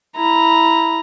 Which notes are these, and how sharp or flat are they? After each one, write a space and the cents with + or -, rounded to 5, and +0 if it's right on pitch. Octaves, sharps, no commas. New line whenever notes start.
E4 +0 A#5 +0